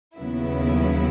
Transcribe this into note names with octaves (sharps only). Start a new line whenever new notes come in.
D#2 C#3 F#3 B3 E4